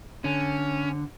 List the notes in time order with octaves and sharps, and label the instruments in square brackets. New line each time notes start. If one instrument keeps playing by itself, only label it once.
[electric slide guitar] D3 [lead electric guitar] C#4